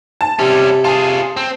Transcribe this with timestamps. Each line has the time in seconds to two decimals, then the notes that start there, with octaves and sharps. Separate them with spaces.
0.21 A5
0.39 C3 G3 C#4
0.85 F4 G#4 A5
1.37 C4